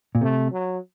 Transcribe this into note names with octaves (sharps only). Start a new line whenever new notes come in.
A#2
C3 A3
F#3